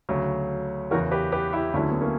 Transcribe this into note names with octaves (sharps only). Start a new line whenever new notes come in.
D2 C#3 F#3
E2 C#3 E3 F#4 A#4
G4 B4
G4 B4
E4 G4
D2 D3 F#3 C#4 E4
B3
A#3 C#4